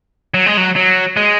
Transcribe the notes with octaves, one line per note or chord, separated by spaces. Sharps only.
F#3
G#3
F#3
F#3
G#3